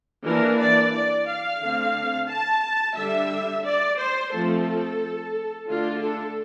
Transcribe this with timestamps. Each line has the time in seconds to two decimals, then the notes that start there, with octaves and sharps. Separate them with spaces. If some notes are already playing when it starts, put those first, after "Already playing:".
0.25 E3 A#3 D4 A#4
0.59 D5
0.93 D5
1.27 F5
1.62 D3 A3 C4
2.29 A5
2.96 D3 G3 D4 E5
3.65 D5
3.98 C5
4.33 F3 A3 C4 A4
5.68 D3 A3 D4 F4
6.02 A4